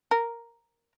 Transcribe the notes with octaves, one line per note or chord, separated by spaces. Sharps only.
A#4